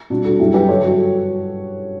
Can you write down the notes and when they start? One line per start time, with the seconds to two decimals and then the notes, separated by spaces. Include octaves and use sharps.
0.10 B2 G3 D4 F#4
0.25 F#4 A4
0.39 F#2 E3 G3 E4 G4
0.54 G4 B4
0.69 G2 D3 F#3 A4 C#5
0.83 F#4 A4